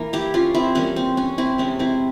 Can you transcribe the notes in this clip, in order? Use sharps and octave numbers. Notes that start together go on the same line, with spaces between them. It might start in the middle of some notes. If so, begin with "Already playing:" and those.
Already playing: E3 A#3
E4 G4
C#4 F4
C4 E4
E3 G3 A#3 C#4
C4
C#4
C4 E4
C3 E3 G#3 C#4
C4 E4